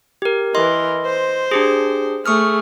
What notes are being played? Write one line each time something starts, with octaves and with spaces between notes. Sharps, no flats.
G4 A#4
E3 A#4 D#5 C6
C5
D4 G4 G#4
A3 G#4 C#6 D#6 F6